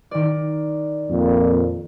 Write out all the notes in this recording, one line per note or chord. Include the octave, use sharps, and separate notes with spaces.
D#3 D5
F2 A#2